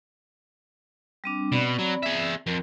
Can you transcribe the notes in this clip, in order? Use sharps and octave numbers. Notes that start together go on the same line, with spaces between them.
G3 C4 D4
B2 C4 D5 B5
F#3
G#4 E5
F2 A#4